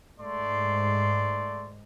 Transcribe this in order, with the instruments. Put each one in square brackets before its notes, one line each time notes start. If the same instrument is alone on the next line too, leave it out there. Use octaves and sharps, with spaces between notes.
[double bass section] G#2 [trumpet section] A3 D5 C6